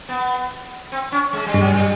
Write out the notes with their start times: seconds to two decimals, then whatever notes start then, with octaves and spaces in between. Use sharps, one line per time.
0.09 B3
0.92 C4
1.12 C#4
1.33 G#3
1.46 G3
1.54 G2
1.60 F#3
1.73 G3